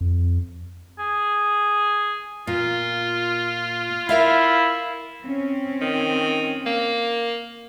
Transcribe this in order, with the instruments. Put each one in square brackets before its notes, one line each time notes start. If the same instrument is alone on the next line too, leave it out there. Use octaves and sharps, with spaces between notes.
[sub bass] F2
[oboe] G#4
[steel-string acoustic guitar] A#2 [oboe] F4
[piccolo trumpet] E4 [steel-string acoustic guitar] A#4 E5 F5
[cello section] C4 C#4
[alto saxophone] D#3
A#3